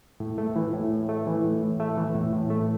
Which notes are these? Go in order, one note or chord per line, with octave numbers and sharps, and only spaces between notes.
A2
A3
E3
A2
A2
A3
E3
A2
A2
A3
E3
A2
A2
A3